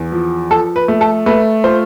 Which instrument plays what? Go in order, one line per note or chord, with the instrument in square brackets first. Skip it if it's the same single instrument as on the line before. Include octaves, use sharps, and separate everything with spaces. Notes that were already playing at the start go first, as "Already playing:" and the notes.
Already playing: [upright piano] E2
F3
F3 A4
B4
A3
A4
A3 B4
F4 C5